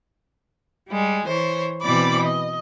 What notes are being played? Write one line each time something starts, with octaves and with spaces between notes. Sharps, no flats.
G3 G#3
E3 C5 C#5
B2 E3 C4 D5 B5 D6
D#5